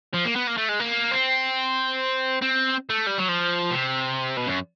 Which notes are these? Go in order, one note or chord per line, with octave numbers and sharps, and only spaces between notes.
F3
A#3
B3
A#3
A3
G#3
A#3
C4
C4
A3
G3
F#3
F3
C3
B2
F#2